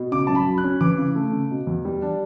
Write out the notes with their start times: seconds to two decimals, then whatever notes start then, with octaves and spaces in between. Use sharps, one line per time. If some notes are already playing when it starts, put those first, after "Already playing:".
Already playing: B2
0.12 C#3 D6
0.27 F#2 A5
0.35 B5
0.47 F#3
0.58 F#6
0.64 C#4
0.81 E3 D6
0.98 C#3
1.15 A3
1.32 C#3
1.51 B2
1.67 E2
1.85 G3
2.02 D4